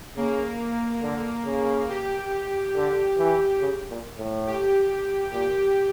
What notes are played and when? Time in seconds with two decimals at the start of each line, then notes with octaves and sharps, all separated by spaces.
0.17 C#3 A#3
1.02 D3
1.45 C#3
1.89 G4
2.75 D3
3.18 E3
3.61 C#3
3.90 A#2
4.17 A2
4.47 G4
5.32 A#2 G4